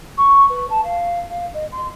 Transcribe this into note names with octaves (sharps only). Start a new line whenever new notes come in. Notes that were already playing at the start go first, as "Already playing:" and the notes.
C#6
B4
A5
F5
F5
D#5
C6